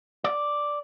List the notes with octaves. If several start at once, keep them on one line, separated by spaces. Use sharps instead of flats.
D5